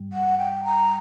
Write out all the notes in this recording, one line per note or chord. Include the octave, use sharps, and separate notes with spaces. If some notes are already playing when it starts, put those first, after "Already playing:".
Already playing: G2 G3
F#5
G5
A#5